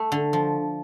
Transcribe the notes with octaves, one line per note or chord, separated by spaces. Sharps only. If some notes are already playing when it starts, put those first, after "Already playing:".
Already playing: A3
D3
F3